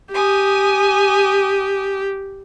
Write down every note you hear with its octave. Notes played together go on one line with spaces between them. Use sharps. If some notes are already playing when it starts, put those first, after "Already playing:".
G4 G#5 D#6